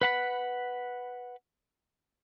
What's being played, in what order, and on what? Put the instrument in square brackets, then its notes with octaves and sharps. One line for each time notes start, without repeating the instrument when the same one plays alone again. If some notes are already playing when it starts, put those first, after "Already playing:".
[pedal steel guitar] B4 F#5 B5